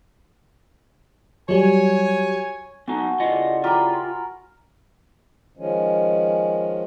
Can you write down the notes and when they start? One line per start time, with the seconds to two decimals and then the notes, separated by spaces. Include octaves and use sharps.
1.49 F#3 G3 C#5 G#5
2.88 B3 D#4 F#4 A4 G#5
3.20 C#3 E4 F4 D5 D#5 F#5
3.64 F4 G4 A#4 A#5 B5
5.57 D#3 F3 G#3 C#4